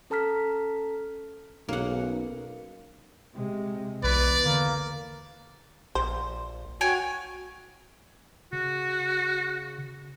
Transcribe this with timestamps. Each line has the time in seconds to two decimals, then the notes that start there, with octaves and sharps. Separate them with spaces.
0.10 C#4 A4 A5 A#5 F6 B6
1.68 B1 A#3 C#4 D#4 G#4 F#5
3.34 C3 G#3
4.04 B1 E2 B4 D5
4.45 D3 A#3
5.95 A#1 C5
6.81 F#4 C#5 G5 G#5
8.53 C#3 F#4